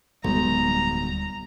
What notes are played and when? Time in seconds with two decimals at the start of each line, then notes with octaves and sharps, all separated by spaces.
0.25 D1 B1 G3 G#3 A#5